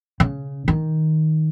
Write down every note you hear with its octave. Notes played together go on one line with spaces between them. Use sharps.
C#3
D#3